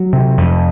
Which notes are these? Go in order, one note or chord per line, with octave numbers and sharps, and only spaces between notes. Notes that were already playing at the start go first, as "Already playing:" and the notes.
Already playing: F#3
C3
F2